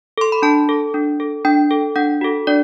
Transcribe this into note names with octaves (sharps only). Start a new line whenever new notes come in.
A4 C6
B5
D4 A5
A4
D4
A4
D4 G5
A4
D4 F#5
F#4 A4
D4 D5